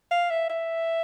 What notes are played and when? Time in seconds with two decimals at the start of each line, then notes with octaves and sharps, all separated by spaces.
0.11 F5
0.31 E5
0.50 E5